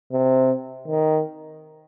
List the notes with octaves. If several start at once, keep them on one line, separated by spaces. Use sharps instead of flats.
C3
D#3